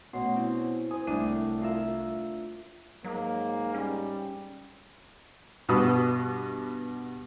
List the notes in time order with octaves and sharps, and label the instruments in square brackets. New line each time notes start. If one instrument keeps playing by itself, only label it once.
[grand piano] B2 C#4 [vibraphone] A3 C#5 F#5 [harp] C6
[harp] C4 [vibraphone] E4
[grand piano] C5 G#5 [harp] D#6
[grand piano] C2 D#7 [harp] A2 D4
[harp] F4 A#4 E5
[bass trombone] G#2 [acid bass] F#3 [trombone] A#3
[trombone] G3 [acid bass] C#4
[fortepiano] G2 B2 B3 F#4 B4 D#6